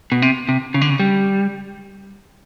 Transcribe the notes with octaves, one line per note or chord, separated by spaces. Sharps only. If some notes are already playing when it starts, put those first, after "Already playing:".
B2
C3
C3
C#3
D3
C#3
G3